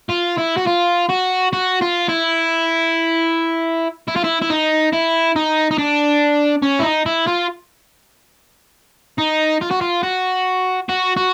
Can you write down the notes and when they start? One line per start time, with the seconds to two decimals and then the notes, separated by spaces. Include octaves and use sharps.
0.10 F4
0.38 E4
0.58 F#4
0.67 F4
1.10 F#4
1.53 F#4
1.81 F4
2.08 E4
4.08 E4
4.16 F4
4.24 E4
4.42 E4
4.50 D#4
4.93 E4
5.36 D#4
5.71 D#4
5.78 D4
6.63 C#4
6.80 E4
6.83 D#4
7.06 E4
7.27 F4
9.18 D#4
9.61 F4
9.71 F#4
9.81 F4
10.03 F#4
10.89 F#4
11.17 F#4